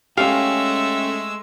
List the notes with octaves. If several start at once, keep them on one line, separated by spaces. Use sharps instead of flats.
G#3 A3 C#4 G4 F5 E6